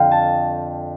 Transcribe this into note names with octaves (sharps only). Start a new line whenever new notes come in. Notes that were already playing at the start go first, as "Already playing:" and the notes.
Already playing: F2 D3 F3 F5 G5
A5